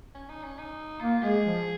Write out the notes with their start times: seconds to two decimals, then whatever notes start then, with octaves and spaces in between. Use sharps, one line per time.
0.15 C#4
0.29 D#4
0.43 C#4
0.58 D#4
1.00 A#3 F4
1.22 G#3 G#4
1.44 F3